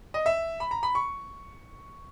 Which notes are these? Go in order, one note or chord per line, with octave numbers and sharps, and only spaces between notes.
D#5
E5
B5
A#5
B5
C#6